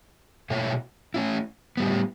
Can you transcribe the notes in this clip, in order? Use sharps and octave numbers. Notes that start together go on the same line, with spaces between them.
B2 A3 E4 A4 C#5
A3 C#4 E4
A2 G3 B3